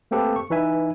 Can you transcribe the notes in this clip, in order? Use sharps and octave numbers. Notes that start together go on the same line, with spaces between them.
A3 A#3 C4 G4 A4 B4
C#6
E3 D#4 B4 E5 G#5